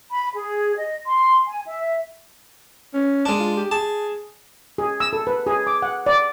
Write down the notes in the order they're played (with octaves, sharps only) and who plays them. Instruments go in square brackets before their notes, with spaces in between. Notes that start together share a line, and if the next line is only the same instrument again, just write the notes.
[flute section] B5
G#4
D#5
C6
G#5
E5
[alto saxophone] C#4
[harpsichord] G#3 D4
[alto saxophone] F4
G4
[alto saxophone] G#4 [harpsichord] A5
[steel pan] G#4
E6
A4
B4
G#4
D6
F#5
D5